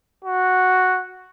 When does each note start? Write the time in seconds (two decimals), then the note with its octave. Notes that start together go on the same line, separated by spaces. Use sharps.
0.24 F#4